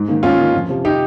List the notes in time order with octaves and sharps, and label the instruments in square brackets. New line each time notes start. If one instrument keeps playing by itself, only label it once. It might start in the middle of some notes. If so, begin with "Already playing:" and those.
Already playing: [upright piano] G#2
D#3 A#3
[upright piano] G#2 [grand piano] C#4 F4
[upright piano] D#3 A#3
F2
C3 F3
[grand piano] D#4 G4